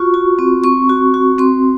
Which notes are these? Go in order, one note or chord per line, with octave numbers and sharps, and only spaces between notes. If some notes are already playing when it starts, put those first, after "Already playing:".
Already playing: F4 F#4 C#6
F#4
C4
C4 C#6
F#4
F#4
C4 C6